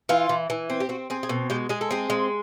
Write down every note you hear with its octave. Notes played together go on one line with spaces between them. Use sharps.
E3 F4
E3
E3
C4
G4
C4 F#4
C4 G#4
G#4
B2 A4
G#3 G4
G#3 G#4
A4
C4 G#4
G#3